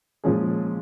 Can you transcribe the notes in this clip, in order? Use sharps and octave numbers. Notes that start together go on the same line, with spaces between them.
A#2 F3 G#3 C#4 G#4